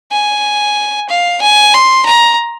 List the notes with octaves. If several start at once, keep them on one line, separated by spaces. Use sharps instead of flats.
G#5
F5
G#5
C6
A#5